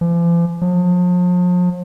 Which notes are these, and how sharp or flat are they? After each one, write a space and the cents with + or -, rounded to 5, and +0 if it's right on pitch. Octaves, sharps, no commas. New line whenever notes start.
F3 -45
F3 +40